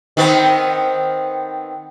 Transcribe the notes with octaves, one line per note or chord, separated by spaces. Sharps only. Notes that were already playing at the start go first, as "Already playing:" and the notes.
D#3 B3 C4